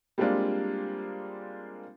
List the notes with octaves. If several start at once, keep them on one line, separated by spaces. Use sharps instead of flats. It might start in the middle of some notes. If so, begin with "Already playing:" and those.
G3 G#3 A#3 C4 D4 F4